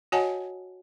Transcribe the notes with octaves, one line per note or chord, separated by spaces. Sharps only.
F#4 C#5 D#5 F#5 G#5 A5